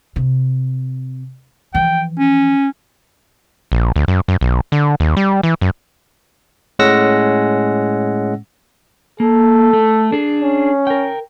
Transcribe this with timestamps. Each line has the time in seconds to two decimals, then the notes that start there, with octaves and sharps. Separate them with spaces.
0.16 C3
1.75 E3 F3 G5
2.19 C#4
3.72 A#1
3.96 D2
4.08 F#2
4.28 F#2
4.41 B1
4.72 D3
5.00 D#2
5.17 G3
5.43 E3
5.61 F#2
6.79 A2 G#3 C#4 F#5 E6 A#6
9.20 A#3 A4
9.73 A3
10.12 D4 G#4
10.42 C#4
10.87 A#4 G5